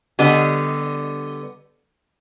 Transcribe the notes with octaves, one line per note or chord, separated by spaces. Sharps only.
D3 G3 B3 D#5